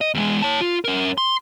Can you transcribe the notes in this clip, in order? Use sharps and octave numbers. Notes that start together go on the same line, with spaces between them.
D#5
E2 G#3
C#5 A5
F4
C#4 A#4
C6